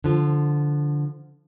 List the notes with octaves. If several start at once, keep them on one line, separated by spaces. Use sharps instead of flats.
D3 F3